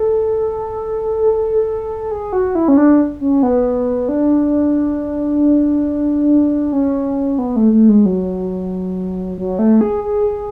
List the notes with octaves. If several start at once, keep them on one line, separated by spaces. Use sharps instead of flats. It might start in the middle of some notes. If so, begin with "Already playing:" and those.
Already playing: A4
G#4
F#4
E4
C#4
D4
C#4
B3
D4
C#4
B3
A3
A3
G#3
F#3
F#3
A3
G#4
G#4